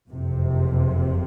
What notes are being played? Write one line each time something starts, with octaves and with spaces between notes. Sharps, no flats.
F#1 F2 C3